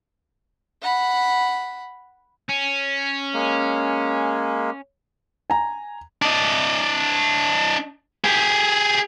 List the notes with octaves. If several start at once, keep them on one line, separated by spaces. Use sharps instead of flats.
F#5 B5
C#4
G#3 A#3
G#5 A#5
D4 D#5
G4 G#4